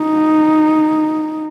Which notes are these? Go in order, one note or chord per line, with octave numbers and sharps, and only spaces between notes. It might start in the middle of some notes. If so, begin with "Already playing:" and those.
Already playing: D#4